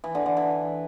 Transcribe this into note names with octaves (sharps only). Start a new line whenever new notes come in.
E3
D3
D3
E3